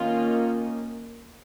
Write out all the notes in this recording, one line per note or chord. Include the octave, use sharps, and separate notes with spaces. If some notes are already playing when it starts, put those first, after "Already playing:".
Already playing: D#3 A#3 C#4 F4